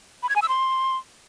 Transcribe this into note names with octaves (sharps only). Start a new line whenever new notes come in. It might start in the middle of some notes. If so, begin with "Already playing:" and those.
B5
G#6
G#5
E6
C6